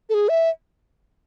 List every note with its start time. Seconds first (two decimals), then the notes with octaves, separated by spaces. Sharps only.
0.09 A4
0.14 G#4
0.29 E5